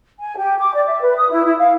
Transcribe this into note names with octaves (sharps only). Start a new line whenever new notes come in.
G#5
G4
D6
D5
E5
B4
D#6
E4
E4
F5